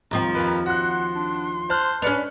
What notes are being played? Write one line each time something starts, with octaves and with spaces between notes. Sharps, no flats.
D#2 F3 C4 A#5
F2 A#4 B4
F#4 F#5 C6 F#6
D4
C5 A5 F6 F#6
C#4 D4 B4 F6 C#7 F7